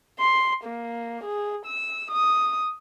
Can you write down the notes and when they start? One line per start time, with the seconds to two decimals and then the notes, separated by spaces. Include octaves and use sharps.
0.20 C6
0.65 A#3
1.25 G#4
1.66 E6
2.12 D#6